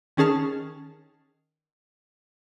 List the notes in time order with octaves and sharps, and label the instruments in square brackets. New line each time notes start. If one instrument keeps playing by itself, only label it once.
[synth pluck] D#3 C#4 G#4 A5 F6